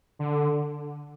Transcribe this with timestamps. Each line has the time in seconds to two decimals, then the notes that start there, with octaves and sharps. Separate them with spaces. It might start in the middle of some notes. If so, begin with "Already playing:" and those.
0.19 D3